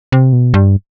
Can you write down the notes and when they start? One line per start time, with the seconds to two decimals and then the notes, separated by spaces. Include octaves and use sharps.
0.12 C3
0.33 B2
0.54 G2